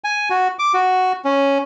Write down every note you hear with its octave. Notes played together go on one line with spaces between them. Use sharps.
G#5
F#4
D6
F#4
C#4